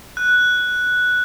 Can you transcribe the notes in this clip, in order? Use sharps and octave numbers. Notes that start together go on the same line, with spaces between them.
F#6